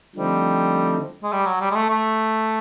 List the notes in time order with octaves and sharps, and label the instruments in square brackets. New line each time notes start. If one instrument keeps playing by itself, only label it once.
[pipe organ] D3 F3 A3 C4 D#4 [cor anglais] G3
[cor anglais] G#3
G3
F#3
G3
G#3
A3
A3